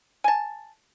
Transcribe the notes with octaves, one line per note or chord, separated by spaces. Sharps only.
G#5 A5